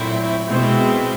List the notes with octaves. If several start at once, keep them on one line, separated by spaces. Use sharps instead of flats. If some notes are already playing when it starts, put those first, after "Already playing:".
Already playing: A#2 F#3 A3 C4 E4
B2 G#3 C4 E4